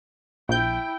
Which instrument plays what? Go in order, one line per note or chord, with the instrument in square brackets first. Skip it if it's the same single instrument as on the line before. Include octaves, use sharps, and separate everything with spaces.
[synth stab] A#1 G6 [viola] E4 G5